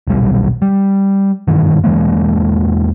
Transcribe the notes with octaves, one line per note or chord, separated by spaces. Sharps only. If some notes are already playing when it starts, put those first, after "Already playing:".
D#1 B1 G3
G3
F#1 G2 D#3 E3
E2 E3 G#3 A#3